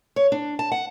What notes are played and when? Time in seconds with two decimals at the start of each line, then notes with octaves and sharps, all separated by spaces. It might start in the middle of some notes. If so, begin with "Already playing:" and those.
0.16 C#5
0.32 D4
0.59 A5
0.72 F#5